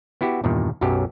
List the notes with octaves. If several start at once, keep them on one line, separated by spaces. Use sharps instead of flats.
B3 E4 F#4 G4
E2 G2 A#2 D#3
B1 F#2 F#3 G4